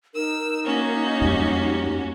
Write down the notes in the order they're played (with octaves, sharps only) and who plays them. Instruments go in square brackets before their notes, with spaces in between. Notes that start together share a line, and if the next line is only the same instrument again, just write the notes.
[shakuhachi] D#4 [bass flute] A#4 [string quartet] E6
[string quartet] A#3 C#4 F#4
[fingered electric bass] F2 G3 [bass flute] G4